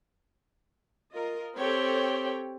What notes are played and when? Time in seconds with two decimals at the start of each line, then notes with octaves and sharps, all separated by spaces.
1.13 F4 A#4 D#5
1.56 C4 G4 A4 C#5 G5